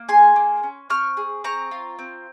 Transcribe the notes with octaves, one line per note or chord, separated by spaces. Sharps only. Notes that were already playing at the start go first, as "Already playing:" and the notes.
Already playing: A#3
G#4 G#5 C6
A#3
C#4
C4 C#6 F6
G#4
C4 A#5 C#6
F4
C4